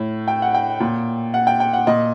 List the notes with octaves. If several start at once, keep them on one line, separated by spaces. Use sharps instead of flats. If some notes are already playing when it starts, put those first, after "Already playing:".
Already playing: A2
G5
F#5
G5
A#2
F#5
G5
G5
F#5
A#2 D#5